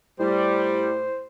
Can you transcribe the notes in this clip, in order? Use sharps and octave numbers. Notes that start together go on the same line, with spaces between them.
A2 G3 C5